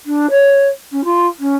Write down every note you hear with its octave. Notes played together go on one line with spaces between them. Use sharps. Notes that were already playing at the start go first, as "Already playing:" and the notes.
D4
C#5
C#4
F4
C#4